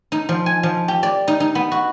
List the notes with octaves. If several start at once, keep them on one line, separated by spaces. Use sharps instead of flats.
D#4
F3
G#5
F3
G4
D5
D#4
D#4
B3
F#4